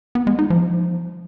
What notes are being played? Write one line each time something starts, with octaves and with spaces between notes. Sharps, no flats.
B3
G#3
D#4
F3